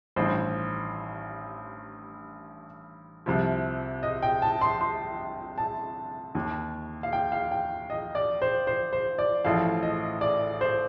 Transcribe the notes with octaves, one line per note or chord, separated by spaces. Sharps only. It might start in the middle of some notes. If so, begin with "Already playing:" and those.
A1 G2 D#3 C5
C2 C3 F3
D#5
G5
A5
C6
C6
A5
D#2 D#3
F5
G5
F5
G5
D#5
D5
C5
C5
C5
D5
A1 A2 F3 F5
D#5
D5
C5